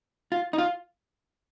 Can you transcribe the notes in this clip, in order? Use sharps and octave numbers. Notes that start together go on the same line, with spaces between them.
F4
D#4
F4